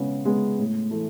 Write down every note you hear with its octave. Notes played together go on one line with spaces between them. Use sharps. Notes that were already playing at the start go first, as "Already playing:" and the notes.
Already playing: C#3 G#3 B3
G#3 B3
A2
E3 A3